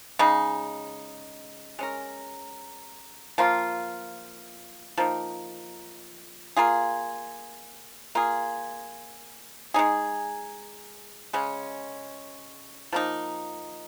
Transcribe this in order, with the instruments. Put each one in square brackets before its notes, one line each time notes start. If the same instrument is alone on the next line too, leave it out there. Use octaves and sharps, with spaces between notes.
[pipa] C#3 G#3 D#4
G#3 C#4 A#4
F3 A#3 F4
F3 A#3 D#4
A#3 F4 G#4
A#3 F4 G#4
G#3 D#4 G#4
C#3 G#3 C#4
F3 A#3 D#4